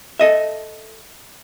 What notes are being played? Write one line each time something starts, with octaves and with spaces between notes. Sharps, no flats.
A4 D#5 E5